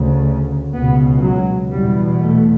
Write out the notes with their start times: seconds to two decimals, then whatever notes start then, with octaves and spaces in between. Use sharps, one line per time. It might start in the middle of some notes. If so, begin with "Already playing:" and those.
Already playing: D2 C#3
0.72 C#2 B2 B3
1.22 F#3
1.70 E2 B2 G3
2.20 A3